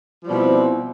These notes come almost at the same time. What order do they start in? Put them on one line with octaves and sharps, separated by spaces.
F3 G3 B2 E4 C4